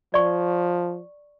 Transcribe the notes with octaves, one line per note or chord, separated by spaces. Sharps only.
F3 D5 C#6